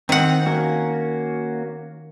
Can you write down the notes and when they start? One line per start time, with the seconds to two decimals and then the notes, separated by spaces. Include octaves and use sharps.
0.09 D#3 C4 F#5
0.46 A#3 C#4 F#4